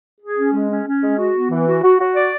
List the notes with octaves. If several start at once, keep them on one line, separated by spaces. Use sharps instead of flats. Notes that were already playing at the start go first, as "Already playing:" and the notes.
G#4
C#4
G#3
C#4
C#4
G#3
F#4
B3
E3
F#4
F#4
F#4
D5